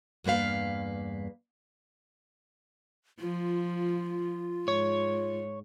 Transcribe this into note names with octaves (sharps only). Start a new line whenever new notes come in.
E2 G2 A#3 B4 F5
F3 F4
G#2 C#5